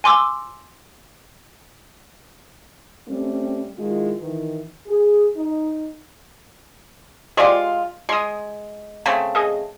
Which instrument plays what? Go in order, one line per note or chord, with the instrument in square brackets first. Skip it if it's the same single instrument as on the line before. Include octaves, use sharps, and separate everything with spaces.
[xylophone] G#5 C6 D6 E6
[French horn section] G3 A3 C4 C#4
D#3 G#3 E4 F4
D#3 E3
G#4
D#4
[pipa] G#3 F4 [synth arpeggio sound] G4 C5 D5
[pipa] G#3 [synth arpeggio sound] C6 D#6
[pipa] C#3 A3 C4
[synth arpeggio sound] G#4 D#5